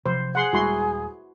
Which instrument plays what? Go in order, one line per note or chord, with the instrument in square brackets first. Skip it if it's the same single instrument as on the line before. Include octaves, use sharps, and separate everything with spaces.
[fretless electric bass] C3 F3 F#3 [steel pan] C5
[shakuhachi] G#4 [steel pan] F#5 C6
[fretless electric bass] D#1 G3 G#3 [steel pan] E4 F#4 C6